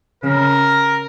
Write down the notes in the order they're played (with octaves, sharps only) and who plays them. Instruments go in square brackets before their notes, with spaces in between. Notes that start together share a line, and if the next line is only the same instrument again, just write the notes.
[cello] C#3 [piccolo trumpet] A#4